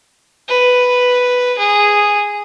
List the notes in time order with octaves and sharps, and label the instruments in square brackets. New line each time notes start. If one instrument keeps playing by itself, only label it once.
[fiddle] B4
G#4